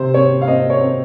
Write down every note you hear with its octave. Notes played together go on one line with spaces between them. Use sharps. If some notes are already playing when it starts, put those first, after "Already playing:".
Already playing: C3 C5
C4 C#5
F5
C4 D#5
C#5
C4